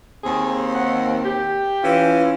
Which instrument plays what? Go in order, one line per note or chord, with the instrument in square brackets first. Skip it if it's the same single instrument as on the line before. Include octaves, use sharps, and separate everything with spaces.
[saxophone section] D#2 C4 [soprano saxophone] G#4
[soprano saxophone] F#5
G4
[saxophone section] E3 C#4 F4